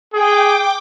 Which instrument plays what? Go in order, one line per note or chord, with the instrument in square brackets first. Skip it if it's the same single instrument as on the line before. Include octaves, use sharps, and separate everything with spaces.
[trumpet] G#4 [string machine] G5 D6